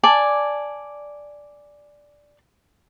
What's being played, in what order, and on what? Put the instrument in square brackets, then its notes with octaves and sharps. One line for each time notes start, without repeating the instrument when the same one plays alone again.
[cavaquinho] D5 G#5 A5